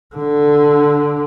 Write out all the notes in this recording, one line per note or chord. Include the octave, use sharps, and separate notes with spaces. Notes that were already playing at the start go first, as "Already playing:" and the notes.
D3